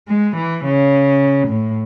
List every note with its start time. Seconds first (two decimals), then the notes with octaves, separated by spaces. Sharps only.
0.08 G#3
0.36 E3
0.65 C#3
1.48 A2